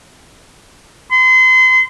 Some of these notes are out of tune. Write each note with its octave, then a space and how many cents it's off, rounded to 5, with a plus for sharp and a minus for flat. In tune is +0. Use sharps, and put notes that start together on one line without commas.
C6 -35